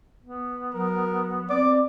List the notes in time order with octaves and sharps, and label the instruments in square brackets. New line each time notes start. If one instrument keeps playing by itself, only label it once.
[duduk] B3
[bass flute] F#3 [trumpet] A#4
[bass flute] C4 [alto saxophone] D5 [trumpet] D6